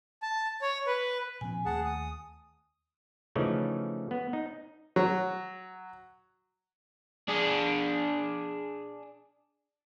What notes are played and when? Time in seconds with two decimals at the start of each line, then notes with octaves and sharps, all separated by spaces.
0.23 A5
0.62 C#5
0.87 B4
1.41 A#2 F3 C4 G#5
1.65 D#2 A3 G#4 F#5 A5
1.85 D#6
3.36 C#3 E3 F3 A3 C#4 D#4
4.11 B3
4.33 D#4
4.96 F#3
7.28 D4 G#4